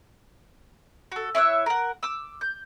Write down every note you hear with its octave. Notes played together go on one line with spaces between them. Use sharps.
F#4 A4
E4 C#5 E5 F#6
A#4 F#5
D6 E6
G6